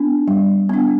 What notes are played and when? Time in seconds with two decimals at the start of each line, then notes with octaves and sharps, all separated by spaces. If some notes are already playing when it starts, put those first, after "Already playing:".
Already playing: B3 D4
0.28 G3
0.69 B3 D4